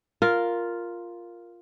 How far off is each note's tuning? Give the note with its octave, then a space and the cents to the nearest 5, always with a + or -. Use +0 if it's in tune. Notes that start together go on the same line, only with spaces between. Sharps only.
F4 +0 A#4 +0